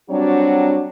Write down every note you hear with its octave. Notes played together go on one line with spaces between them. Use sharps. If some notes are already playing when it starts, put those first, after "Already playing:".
F#3 G3 C4 D4 F#4 C#5